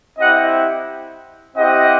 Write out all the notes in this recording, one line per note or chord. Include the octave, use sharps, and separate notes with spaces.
C4 E4 G4 D#5 F#5
C4 E4 G4 D#5 F#5